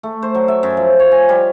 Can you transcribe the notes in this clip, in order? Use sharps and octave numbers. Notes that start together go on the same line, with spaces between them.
A3
C5
F#3
E5
F#2
F3
C#5
G#5
G3